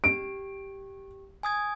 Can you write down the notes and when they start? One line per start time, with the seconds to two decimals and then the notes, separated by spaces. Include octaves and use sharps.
0.04 G4 D7
1.43 G#5 D#6 G#6